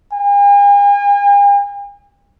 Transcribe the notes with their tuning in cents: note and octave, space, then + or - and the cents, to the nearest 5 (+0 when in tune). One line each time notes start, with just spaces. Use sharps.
G#5 -45